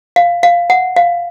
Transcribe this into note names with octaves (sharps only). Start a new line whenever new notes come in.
F5
F5
F#5
F5